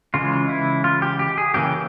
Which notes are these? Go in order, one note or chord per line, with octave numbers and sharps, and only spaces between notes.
C#3 E3 G#3 F4
E4
F4
G4
G4
G#4
C#3 E3 A#3 C#4 G4